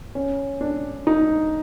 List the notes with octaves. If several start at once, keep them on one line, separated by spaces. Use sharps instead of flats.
C#4
D4
D#4